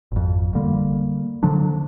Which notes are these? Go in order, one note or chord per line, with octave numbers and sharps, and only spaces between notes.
G#1 F2
D3 G3 A#3
D3 F3 F#3 D4